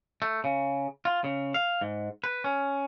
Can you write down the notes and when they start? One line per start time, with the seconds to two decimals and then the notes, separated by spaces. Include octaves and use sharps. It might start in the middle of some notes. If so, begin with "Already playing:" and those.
0.22 A3
0.44 C#3
1.05 F4
1.24 C#3
1.54 F5
1.81 G#2
2.24 B4
2.44 C#4